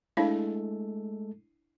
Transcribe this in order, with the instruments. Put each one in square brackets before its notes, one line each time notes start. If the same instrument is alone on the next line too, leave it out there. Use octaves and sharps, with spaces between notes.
[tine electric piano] G#3 A3 A4 [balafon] D4 E4 F5